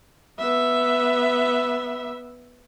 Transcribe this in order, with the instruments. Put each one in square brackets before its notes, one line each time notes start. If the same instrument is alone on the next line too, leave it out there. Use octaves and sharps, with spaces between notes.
[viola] B3 E5